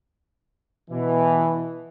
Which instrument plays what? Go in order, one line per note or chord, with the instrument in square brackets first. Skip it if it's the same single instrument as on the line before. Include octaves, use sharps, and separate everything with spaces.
[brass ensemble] B2 E3